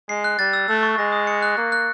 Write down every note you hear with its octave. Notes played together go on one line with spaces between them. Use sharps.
G#3 C7
F#6
G3 A6
E6
A3 E6
C#6
G#3 A#6
D#6
C#7
F#6
A#3 F#6
F#6